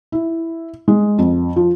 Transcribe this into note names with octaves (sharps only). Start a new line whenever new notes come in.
E4
G#3
F2
F3